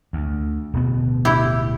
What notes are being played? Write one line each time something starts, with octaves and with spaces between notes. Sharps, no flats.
D2
D1 B2 B3
E4 G4